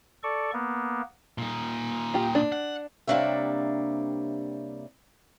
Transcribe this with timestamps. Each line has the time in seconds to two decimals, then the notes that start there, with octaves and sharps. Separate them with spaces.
0.23 A4 D5 C#6
0.53 A#3 B3
1.38 A#2 D#4
2.14 F4 G4
2.35 D4
2.52 F#5
3.07 C3 G3 A#3 D4 C#5 E5